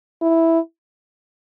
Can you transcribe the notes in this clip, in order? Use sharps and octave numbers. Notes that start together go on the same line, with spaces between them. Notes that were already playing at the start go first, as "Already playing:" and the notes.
E4